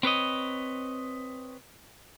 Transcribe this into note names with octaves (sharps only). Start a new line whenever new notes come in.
C4 B4 C#5 D#5